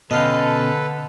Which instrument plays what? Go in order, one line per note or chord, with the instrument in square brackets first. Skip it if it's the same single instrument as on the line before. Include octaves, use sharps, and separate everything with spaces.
[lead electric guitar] B2 C#4 [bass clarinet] D3 [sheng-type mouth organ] A4 B4 [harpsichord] D#5 F5 G5